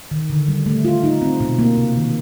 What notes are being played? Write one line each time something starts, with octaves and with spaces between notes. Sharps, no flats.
D#3
D3
G3
A3
F4
D#4
C4
B2
A#3
C3
D#3